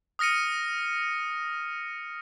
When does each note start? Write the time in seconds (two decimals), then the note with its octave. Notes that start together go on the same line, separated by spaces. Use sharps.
0.19 D#6 F6 A#6 C#7 D#7